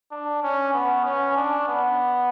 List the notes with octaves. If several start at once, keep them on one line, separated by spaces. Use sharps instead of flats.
D4
C#4
B3
C#4
D4
B3